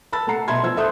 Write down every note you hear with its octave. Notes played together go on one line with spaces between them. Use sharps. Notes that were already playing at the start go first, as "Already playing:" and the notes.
A5 B5 E6 A6
A3 F#5 A#5 C7 C#7
B2 E5 B5 C6 G#6
F3 C5 E6 G#6
A4 E5 C6 D#6 F#6 G6